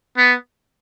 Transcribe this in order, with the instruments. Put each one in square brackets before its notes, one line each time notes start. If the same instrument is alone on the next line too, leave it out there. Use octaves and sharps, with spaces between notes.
[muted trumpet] B3